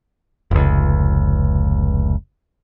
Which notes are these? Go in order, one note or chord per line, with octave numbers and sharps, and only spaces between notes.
F1 C#2